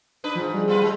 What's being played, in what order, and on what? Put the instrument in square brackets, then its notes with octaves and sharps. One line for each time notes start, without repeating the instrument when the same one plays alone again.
[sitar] D4 B4
[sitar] G#2 [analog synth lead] F3
[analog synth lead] G3
[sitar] B3 F4 B4
G#3